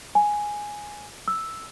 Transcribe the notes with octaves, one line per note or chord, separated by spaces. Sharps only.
G#5
E6